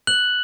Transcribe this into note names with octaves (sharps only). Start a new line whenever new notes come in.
F#6 F#7